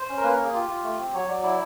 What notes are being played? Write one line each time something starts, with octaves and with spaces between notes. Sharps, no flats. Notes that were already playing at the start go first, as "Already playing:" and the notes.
Already playing: C5
C#4
A#4
A#3 B4
A#3 A#4
G#4
F4 G4
F4
A3
C4
F#3 C#5
F#3 D5
E4 D5